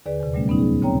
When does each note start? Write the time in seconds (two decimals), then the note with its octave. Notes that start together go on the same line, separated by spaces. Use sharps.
0.06 D#2 D3 G#4 B4 D5
0.20 E2 C3
0.34 A#2 F#3 G3 A3 C#4
0.47 D2 F#3 B3 C#4 D#4
0.59 G#4
0.82 F#2 C#3 C4 C#5 G5 A#5